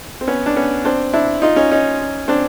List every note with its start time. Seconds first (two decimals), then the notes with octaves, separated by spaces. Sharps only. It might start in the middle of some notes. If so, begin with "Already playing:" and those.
0.21 C4
0.27 B3 C#4
0.46 D4
0.56 B3 C#4
0.85 C4 D4
1.13 D4 E4
1.42 D#4 F4
1.56 C#4 D#4
1.71 C#4 D#4
2.28 C4 D4